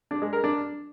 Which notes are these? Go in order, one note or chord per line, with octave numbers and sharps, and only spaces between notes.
D4
G#3
A#4
D4